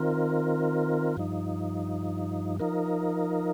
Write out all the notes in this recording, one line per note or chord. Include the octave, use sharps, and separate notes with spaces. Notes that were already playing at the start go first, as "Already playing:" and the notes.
Already playing: D#3 C4 F4 A#4
G2 F3 D#4
F3 D#4 A#4